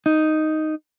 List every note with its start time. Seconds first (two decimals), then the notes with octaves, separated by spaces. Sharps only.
0.06 D#4